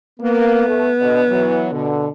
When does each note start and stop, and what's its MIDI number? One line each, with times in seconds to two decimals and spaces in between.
0.20 0.65 58
0.20 1.92 59
0.66 0.87 57
1.00 1.21 47
1.00 1.21 50
1.00 1.21 75
1.28 1.69 52
1.28 1.69 54
1.71 2.08 47
1.71 2.08 50